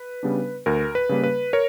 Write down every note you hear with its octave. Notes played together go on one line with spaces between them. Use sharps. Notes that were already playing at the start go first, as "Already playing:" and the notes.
Already playing: B4
C#3 G3 B3 D4
D2 A#4
B4
C#3 G3 A#3
B4
A#4 C#5